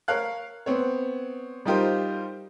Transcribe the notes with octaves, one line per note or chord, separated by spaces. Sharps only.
A#4 C#5 F5 F#6
B3 C4 C#5
G3 D#4 F4 G4 A#4 C5